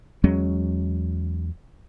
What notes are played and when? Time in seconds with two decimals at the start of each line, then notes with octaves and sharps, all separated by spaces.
0.24 E2 F#3 G#3 C#4